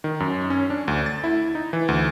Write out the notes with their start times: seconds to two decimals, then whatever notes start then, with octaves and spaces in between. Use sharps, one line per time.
0.04 D#3
0.20 F#2
0.50 C#4
0.70 D4
0.88 D2
1.06 A6
1.24 E4
1.55 D#4
1.73 E3
1.88 D2